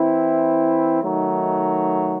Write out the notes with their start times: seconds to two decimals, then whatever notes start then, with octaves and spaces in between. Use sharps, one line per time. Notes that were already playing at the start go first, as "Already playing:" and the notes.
Already playing: E3 C4 E4
1.02 D#3 F#3 A3 D#4